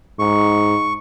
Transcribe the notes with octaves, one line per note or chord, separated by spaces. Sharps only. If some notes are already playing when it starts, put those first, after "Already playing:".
G#2 C#6